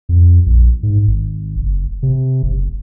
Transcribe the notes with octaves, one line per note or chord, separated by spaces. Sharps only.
F2
A#1
G#2
G#1
F#1
C3
F#1